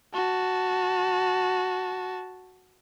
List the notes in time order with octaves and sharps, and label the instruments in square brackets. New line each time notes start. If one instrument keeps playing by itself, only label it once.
[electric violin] F#4 A5